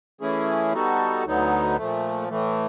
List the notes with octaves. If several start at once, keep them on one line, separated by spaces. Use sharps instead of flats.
E3 A3 C#4 E4 G#4
G3 B3 D#4 F#4 A4
D2 D3 F#3 B3 D#4
A#2 F3 A3
A2 E3 A3